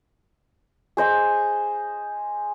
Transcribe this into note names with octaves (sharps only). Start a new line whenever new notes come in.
G#4 C5 D#5 G#5